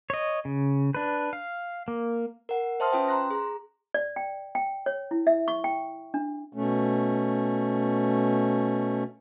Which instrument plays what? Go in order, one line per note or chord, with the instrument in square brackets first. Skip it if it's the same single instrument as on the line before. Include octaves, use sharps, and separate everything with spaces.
[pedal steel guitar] C#5 D#5
C#3
D4 B4
F5
A#3
[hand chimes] A#4 F#5
C5 E5 A5 C6 D#6 F6
C#4 F4 B4 G5
A#5 C6 F#6 A#6
G#4 A#5
[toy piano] D5
G5
G5
C#5
E4
E5
C#6
G5
D4
[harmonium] B2 A3 C#4